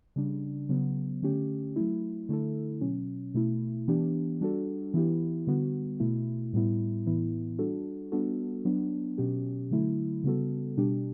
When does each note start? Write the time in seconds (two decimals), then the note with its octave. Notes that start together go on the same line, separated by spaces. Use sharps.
0.16 C#3 G3 D4
0.69 C#3 F#3 B3
1.22 D3 A3 C#4 G4
1.76 F#3 A3 E4
2.29 D3 A3 E4 A4
2.81 B2 F#3 C#4
3.34 B2 A3 E4
3.88 E3 B3 D4 G4
4.41 G3 D4 F#4 A4
4.94 E3 B3 E4 G4
5.47 D3 G3 B3 F#4
6.00 B2 A3 E4
6.53 A2 G3 B3 E4
7.06 A2 E3 B3 E4
7.59 G3 D4 F#4 A4
8.12 G3 B3 D4 F#4 A4
8.65 F#3 B3 D4
9.18 B2 F#3 C#4 G4
9.71 D3 F#3 A3 E4
10.24 C#3 G3 B3 F#4 A4
10.77 B2 G3 D4 G4